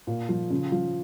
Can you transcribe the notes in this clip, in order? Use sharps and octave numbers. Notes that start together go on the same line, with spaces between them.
A#2
F3
C#3
F3